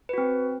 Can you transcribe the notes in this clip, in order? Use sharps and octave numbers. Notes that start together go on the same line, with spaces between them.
C4 F#4 B4